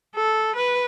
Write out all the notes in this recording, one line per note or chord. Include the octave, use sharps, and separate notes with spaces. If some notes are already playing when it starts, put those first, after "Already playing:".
A4
B4